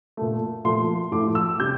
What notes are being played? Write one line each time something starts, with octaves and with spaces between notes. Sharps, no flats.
A#2 A3
A#2 F3 A3 C6
A2 F3 A3 D6
E6
C3 G3 G6